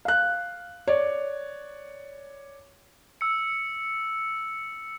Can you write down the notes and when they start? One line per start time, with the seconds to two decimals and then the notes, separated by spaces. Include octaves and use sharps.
0.05 F5 F#6
0.88 C#5 D5
3.21 E6 C#7